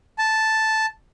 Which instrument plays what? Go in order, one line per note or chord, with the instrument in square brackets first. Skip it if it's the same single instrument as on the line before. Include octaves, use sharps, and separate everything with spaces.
[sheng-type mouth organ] A5